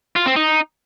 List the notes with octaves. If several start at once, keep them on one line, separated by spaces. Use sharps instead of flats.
F4
C4
D#4